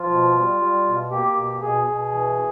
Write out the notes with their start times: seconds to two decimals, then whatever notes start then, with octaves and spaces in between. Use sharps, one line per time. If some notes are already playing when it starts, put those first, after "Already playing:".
Already playing: F3 F4
0.10 B2
0.36 G3
0.61 G3
0.86 B2
1.11 A#3 G4
1.37 B2
1.61 B2 G#4
1.87 B2
2.12 E3